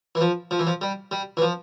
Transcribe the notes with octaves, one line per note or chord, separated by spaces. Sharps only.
E3
F3
F3
E3
F3
G3
G3
E3
F3